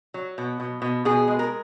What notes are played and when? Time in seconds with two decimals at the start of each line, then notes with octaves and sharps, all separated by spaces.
0.14 F#3
0.38 B2
0.60 B2
0.82 B2
1.05 B2 G#4
1.28 G#3
1.39 A#4